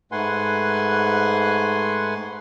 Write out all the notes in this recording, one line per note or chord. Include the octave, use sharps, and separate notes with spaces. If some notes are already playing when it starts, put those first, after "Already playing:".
G#2 A3 B4 F#5 G#5 C6